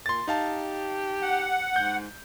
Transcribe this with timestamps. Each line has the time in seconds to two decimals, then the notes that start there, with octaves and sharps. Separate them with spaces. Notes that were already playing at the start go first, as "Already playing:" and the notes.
0.06 A#2 C6 A6
0.28 D#4 G4 F5 A5
1.22 F#5
1.76 G#2 G6